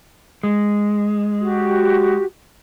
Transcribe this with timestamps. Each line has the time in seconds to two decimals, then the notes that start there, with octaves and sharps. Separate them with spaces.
0.43 G#3
1.41 F#4 G4